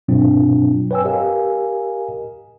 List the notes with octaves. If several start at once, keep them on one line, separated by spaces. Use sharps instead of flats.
G2 B2 F#3 C4 D4 F4
B4 C#5 G5 G#5 E6
G4 A#4 D#5 F5 G#5